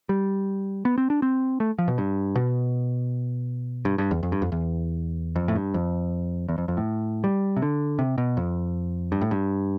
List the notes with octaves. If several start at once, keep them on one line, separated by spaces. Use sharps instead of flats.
G3
B3
C4
D4
C4
A3
F3
B2
G2
B2
G2
G2
E2
F2
G2
F2
E2
F2
A2
G2
F2
E2
F2
F2
A2
G3
C3
D3
C3
B2
F2
G2
A2
G2